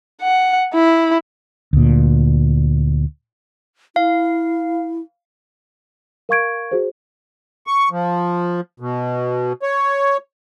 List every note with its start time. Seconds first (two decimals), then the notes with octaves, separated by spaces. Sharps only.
0.22 F#5
0.74 E4
1.73 D2 A#2
3.96 E4 F5
6.29 A#4 F5 C#6 G#6 D7
6.72 F#4 G#4 C5
7.67 C#6
7.91 F3
8.80 B2
9.62 C#5